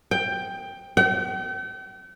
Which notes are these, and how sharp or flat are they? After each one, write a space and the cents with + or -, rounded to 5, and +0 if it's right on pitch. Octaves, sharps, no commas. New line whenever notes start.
G5 +10
G5 -40